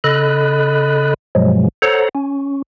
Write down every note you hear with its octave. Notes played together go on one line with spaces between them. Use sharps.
C#3 A4 D#5 B5 F#6
G2 B2 F3 F#3 G#3
A4 C5 C#5 F#5 A#5
C#4